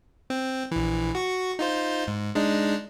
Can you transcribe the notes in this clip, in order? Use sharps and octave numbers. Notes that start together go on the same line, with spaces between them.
C4
A#1 E3
F#4 C#6
D#4 F4 C5
G#2
G#3 D4 D#4